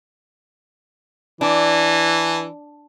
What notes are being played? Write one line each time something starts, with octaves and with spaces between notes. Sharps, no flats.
E3 D4